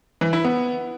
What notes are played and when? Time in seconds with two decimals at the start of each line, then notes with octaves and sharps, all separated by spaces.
0.21 E3
0.33 E4
0.45 B3